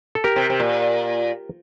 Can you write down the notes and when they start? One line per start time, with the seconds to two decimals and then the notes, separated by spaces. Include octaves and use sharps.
0.15 A4
0.24 G4 A#4
0.36 C3
0.50 C3
0.60 A#2